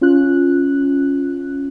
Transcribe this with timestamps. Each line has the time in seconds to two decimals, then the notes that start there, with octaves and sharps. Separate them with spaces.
0.01 C#4 F4 F#6